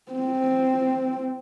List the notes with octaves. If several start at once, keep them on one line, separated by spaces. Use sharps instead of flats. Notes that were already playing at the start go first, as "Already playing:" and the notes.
C4